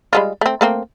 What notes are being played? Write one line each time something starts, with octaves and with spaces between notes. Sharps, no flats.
G3 G#3 F4
A3 C4
A3 A#3 C4